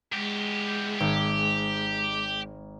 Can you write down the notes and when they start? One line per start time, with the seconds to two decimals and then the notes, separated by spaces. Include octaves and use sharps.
0.12 E2 G#3 G4
0.99 G#1 G4 G#6